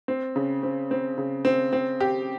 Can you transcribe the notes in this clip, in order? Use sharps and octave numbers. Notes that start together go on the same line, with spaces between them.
C4
C#3
C4
C4
C#3
C4
C4
G4